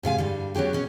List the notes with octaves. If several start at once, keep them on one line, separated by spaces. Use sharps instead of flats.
G#2 C3 F5 G#5
G2 D3 G3
F#3 B3 C#4 G4 G#4
B2 C#4 C#5